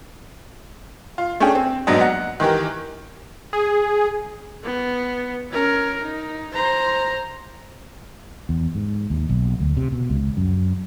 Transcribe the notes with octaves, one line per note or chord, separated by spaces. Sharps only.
F4
A3 C#4 D4 G#4 G5
C4
A#1 G#2 F#3 B3 D4 D#5
F#5
D#3 E3 G4 A#4
G#4
B3
C#4 A#4
D#4
C5 A#5
E2
G#2
D#2
B1
D2
C3
B2
C#2
F#2